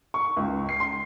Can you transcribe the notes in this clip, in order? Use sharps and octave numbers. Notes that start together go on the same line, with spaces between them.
C#6
C#2
C7
C6